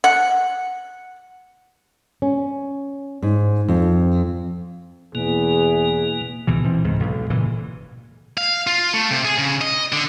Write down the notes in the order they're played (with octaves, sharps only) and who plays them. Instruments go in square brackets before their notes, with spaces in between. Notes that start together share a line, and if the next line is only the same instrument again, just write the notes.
[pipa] F#5
[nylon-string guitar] C#4
G#2
F2
[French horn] E2 [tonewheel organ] B2 A#3 [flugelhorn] G#4
[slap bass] C#2 B2 E3
B2 E3 C4
C#2 G#2
B1
F#1 A#2 C#3 E3
[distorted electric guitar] F5
F4
A3
C3
G#4
C#3
D#5
D3